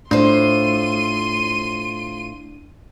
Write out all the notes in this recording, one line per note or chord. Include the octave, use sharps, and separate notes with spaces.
A2 D4 F4 C5 C6 D#7